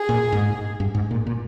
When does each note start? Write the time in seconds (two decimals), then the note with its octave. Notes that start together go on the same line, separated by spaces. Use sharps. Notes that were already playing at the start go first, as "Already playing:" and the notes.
Already playing: G#4
0.09 A#2
0.32 G#2
0.80 G2
0.95 G#2
1.11 A#2
1.27 A#2